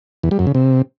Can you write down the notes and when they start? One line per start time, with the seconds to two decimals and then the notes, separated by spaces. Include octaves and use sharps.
0.23 E2
0.31 G3
0.39 F#2
0.47 C#3
0.55 C3